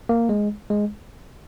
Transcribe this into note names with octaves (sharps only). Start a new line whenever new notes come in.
A#3
G#3
G#3